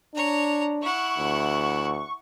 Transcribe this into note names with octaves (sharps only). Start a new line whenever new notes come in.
D4 C#5 A#5
E4 F#5 C#6
D2